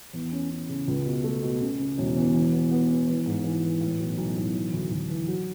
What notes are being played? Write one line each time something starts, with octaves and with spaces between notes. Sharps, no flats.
E2
C#4
C#4
C#3
C#2
B2
A3
B2
C#3
C#3
E1
E2
E3
B3
B3
B3
E3
G#2
E3
E3
A2
B1
B1
B1
E3
D2
D2
E3
F#3